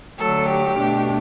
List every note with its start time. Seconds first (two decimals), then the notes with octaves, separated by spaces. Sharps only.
0.19 D3 F#3 A3 A4
0.49 G4
0.78 B2 A3 D4